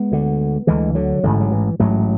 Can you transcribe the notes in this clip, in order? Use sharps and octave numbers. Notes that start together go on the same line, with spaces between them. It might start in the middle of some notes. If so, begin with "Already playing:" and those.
Already playing: G#3 B3
D2 D3
D2 D3 E3 G#3
D3 F#3
A1 G#2 D3
F#3
E3
A1 G#2 F#3 A3